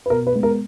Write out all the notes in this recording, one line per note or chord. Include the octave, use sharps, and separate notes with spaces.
B4
B2 A#4
B4
G#3 B3
A#4